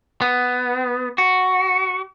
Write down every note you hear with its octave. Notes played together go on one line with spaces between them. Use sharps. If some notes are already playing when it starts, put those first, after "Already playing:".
B3
F#4